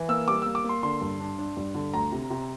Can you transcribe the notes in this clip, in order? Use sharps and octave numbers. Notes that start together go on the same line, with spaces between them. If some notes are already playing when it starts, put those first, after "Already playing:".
Already playing: E3
A#3 E6
G3 D6
A#3 E6
D6
A#3
C6
D3 C6
G2
D4
D4
G2
D3
D2 A#5
C3
C3